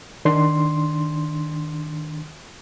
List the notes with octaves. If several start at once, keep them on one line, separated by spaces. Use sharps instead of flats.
D#3 D4 C6